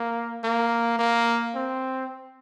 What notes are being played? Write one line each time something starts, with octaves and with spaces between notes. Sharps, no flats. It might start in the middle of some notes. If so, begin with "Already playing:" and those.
Already playing: A#3
A#3
A#3
C4